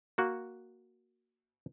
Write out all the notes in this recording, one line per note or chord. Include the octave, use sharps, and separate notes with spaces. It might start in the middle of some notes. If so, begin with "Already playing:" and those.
A#3 F#4